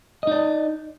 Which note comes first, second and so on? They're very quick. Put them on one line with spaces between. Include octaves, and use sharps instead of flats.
D#5 D#4 D5